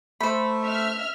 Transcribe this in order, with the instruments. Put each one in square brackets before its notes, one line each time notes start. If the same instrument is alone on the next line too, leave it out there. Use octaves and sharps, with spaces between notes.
[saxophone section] A3 [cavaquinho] C5 B5
[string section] E5 F6